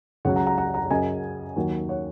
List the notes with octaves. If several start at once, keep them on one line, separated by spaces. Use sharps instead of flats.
C#2 C#3 F#3 C#5 F#5
F#5 A#5
F#5 A#5
F#5 A#5
F#5 A#5
F#2 C#3 F#3 D#5 G#5
D#2 D#3 F#3
C#5 F#5